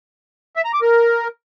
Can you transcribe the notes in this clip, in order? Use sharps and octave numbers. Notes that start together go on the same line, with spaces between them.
E5
A#5
D6
A#4